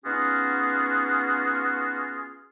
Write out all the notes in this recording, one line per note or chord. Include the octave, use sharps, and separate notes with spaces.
B3 C#4 D#4 F4 F#4 G#4